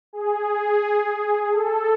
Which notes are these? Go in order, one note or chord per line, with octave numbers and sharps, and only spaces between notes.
G#4
A4